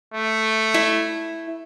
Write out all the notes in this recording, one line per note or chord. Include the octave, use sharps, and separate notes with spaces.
A3
E4